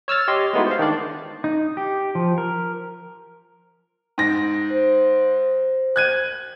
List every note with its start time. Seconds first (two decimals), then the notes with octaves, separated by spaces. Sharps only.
0.08 C#5 E6 F6 A6
0.28 G4 C#5 D#5 C6
0.53 G#3 A3 B3 D#4 E4 F#4
0.67 C5 F5
0.79 D#3 D4 D5
1.44 D#4
1.77 G4
2.15 F3
2.38 A#4
4.18 G#2 A#6
4.70 C5
5.96 F#6 G#6 D#7